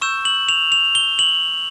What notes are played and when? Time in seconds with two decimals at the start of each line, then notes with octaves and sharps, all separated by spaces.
0.01 C#6 E6 G6 E7
0.25 F#7
0.49 F7
0.72 F7
0.95 G7
1.19 F#7